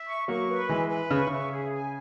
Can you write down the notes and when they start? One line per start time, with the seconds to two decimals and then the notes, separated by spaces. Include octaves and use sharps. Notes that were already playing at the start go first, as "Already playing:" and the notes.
Already playing: E5
0.08 C#6
0.28 F#3 A#3 C#6
0.49 B4
0.69 E3 G#3 E5
0.89 B4
1.10 C#3 C#6
1.27 C#3 E5
1.52 G#4
1.73 G#5